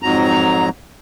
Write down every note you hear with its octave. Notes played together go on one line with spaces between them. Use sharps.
F2 G#2 F#3 A#5